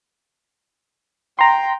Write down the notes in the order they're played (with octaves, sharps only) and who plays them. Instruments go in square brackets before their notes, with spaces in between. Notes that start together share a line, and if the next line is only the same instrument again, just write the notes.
[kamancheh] G5 [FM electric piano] A#5 C6